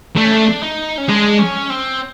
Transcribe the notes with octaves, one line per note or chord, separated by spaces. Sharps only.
A3 D4
C#4
D4
D#4
C#4
G#3 D4
C#4
C4